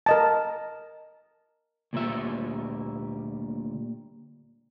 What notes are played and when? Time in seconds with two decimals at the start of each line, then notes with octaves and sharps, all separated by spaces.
0.06 A#4 D#5 A5
1.93 D2 A#2 G3 E5